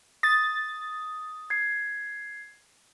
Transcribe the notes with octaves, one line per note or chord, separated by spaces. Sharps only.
D#6 A6
G#6 C7